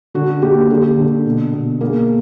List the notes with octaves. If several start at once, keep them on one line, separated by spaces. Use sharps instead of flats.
D3 F#4
A#3 G4
D3 G4 A4
D3
B2
B2
A#3 G#4 A#4